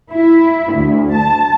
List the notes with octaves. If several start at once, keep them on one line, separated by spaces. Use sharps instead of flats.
E4
D2
A5